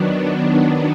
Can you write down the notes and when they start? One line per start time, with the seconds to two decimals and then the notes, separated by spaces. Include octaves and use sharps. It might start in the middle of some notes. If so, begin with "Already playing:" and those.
Already playing: D#3 F#3 B3 D4